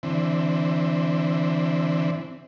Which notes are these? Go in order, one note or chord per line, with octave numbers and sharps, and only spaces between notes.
D3 E3 C4